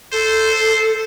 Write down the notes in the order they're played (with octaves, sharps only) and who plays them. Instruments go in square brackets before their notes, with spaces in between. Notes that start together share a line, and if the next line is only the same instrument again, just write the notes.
[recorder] A4 [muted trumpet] C5